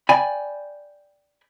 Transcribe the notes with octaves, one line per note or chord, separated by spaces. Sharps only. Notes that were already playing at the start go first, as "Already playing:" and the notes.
D5 G5 G#5 B5